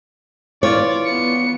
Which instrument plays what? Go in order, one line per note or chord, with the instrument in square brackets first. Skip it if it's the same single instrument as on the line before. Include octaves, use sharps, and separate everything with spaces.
[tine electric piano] E3 F4 [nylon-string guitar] C#5 [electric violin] D5
[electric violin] B3 C#7